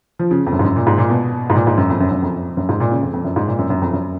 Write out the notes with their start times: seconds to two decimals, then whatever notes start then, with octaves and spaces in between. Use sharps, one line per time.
0.19 F3
0.31 C#3
0.46 F2
0.52 F#2
0.59 G#2
0.64 F#2
0.76 A#2
0.87 G#2
0.98 A#2
1.09 B2
1.50 G#2
1.55 A#2
1.67 G#2
1.77 F#2
1.90 F2
2.00 F#2
2.12 F#2
2.22 F2
2.57 F#2
2.69 G#2
2.80 A#2
2.91 C#3
3.03 F2
3.13 F2
3.24 F#2
3.36 G#2
3.48 A#2
3.58 F#2
3.70 F#2
3.82 F2
3.93 F#2